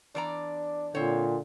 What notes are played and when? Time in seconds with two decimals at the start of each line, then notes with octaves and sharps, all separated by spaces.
0.15 E2 D4 D5 A#5
0.95 A#2 D3 C4 C#5